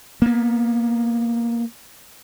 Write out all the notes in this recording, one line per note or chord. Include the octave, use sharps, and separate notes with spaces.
A#3 B3